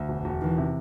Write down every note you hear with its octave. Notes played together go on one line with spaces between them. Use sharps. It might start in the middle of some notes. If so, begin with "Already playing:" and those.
Already playing: D2
E1
E1
D#3 E3
C3